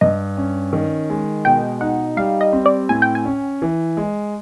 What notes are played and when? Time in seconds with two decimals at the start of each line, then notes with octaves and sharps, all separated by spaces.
0.01 G2 D#5
0.37 C#4
0.73 D#3
1.10 G#3
1.45 B2 G5
1.81 D#4 F#5
2.17 G3 F5
2.41 D#5
2.53 C4
2.66 D5
2.89 A2 G#5
3.02 G5
3.15 G#5
3.25 C#4
3.62 E3
3.97 G#3